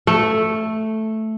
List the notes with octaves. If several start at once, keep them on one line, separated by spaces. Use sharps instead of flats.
A3